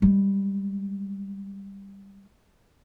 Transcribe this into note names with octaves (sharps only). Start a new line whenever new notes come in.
G3 G#3